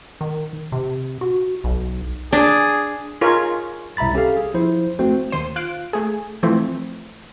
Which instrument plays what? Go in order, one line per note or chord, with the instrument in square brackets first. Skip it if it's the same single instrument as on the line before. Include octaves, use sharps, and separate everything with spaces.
[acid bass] D#3
C3
F#4
B1
[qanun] D4 [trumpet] G#4
[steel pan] D#4 F4 G#4 A#4 C#5
[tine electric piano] C2 E5 A#5 B5 A6
C#4 G4 A4 F5
G#4
F3 E4 C5
A3 C4 F#4 C5
[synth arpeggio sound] D#2 C5 D#7 E7
F4 F5 F#6 D7
A3 G#4
E3 F3 A3 C4